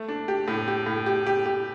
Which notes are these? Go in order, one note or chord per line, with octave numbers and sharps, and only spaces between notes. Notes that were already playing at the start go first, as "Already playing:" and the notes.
Already playing: A3
D4
G4
A2
G4
A2
G4
G4
G4